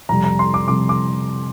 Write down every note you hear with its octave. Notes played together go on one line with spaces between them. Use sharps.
F2 C3 G3 A#5
A#5
C6
D6
F2 C3 G3 D6
D6